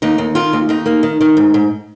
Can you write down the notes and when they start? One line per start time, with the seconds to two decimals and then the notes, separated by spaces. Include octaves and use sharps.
0.02 D#2 D#4
0.18 D#2
0.35 D#3 F4
0.53 D#2
0.69 D#2 D#4
0.86 A#3
1.03 D#3
1.21 D#3
1.37 G#2
1.54 G#2